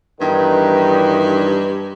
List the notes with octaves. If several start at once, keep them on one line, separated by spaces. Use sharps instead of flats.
E2 G2 D#3 D#4 B4